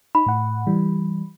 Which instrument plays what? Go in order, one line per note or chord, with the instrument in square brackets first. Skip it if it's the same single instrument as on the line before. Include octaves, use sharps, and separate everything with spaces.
[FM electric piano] D#4 [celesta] B5
[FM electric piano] A2 F#5
E3 G3